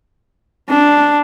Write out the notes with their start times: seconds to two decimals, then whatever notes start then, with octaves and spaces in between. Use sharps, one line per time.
0.69 D4